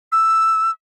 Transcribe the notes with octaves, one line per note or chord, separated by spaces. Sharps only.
E6